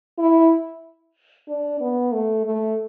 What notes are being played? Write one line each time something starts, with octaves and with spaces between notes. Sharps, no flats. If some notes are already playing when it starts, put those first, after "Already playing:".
E4
D4
B3
A3
A3